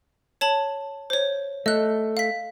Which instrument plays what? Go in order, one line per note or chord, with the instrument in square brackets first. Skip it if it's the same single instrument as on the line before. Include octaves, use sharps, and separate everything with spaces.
[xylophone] C#5 A5 F#7
C5 C#5
[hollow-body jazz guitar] A3 [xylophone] D#5 F#6
[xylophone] F5 B6